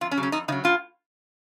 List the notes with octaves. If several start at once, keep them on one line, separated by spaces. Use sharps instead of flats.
F2 F4
C#4
C#3 F#3
C#4
F2 D#4
C#3 F#3 D#4
A2 F4